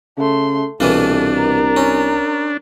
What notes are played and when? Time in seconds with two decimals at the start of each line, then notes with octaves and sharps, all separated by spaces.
0.18 C#3 A3 C6
0.80 C2 B2 E3 A#3 D4 A4
1.35 A#4 A#5
1.77 C#4